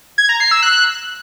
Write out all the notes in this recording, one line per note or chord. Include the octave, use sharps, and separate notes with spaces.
G#6
A#5
C7
E6
F#6